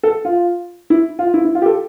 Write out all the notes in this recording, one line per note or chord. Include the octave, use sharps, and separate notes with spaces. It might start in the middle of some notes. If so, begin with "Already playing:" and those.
A4
F4
E4
F4
E4
E4
F4
G4
A4